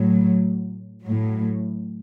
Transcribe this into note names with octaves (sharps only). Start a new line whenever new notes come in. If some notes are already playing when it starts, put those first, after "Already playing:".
Already playing: A2 F#3
A2 F#3